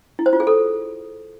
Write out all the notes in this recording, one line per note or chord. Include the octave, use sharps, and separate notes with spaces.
E4
C5
F4
G#4
A4